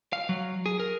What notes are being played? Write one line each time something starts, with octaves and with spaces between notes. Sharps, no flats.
F5
F#3
G#4
A#4